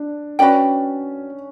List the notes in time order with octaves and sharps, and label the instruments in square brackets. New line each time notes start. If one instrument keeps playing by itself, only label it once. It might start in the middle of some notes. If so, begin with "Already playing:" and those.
Already playing: [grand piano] D4
[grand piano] C#4 [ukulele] F#4 B4 D5 G5